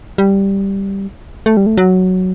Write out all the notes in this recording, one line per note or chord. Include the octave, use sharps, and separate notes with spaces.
G3
A3
G3
A3
F#3